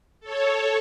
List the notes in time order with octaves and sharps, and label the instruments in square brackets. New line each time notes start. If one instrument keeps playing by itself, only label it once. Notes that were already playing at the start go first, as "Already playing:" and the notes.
[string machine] A4 C#5